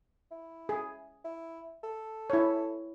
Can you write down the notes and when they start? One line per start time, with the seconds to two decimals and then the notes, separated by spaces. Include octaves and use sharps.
0.31 E4
0.69 G#4
1.24 E4
1.83 A4
2.30 E4 C#5